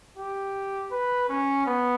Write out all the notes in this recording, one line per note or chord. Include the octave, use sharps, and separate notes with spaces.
G4
B4
C#4
B3